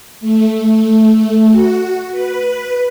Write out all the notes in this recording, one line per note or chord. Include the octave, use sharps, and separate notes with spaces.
A3
F#4
B4